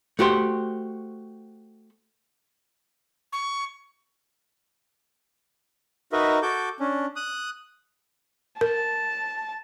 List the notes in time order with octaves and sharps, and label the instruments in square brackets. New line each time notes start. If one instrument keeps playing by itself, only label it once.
[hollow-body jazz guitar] A3 F#4 G4 C5
[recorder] C#6
[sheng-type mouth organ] D#4 F#4 A#4 B4 D#5 E5
F#4 A4 D6 G6
C#4 D4
D#6 F#6
[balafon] A#4 [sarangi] A5